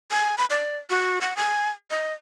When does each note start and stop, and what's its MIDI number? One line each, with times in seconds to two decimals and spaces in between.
0.11 0.36 80
0.38 0.45 83
0.50 0.77 74
0.90 1.19 66
1.21 1.36 78
1.37 1.69 80
1.91 2.13 75